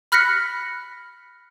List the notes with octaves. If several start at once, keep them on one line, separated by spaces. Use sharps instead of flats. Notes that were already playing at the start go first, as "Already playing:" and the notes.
B5 F6 F#6 A#6 B6 C#7